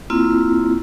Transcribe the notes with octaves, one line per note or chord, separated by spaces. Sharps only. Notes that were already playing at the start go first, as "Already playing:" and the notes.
A#3 C4 E4 F4